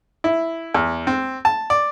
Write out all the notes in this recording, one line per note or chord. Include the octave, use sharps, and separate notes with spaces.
E4
E2
C4
A5
D5